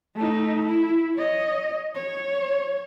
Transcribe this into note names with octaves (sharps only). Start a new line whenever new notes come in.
A3 D#4
E4
C#5 D#5
C#5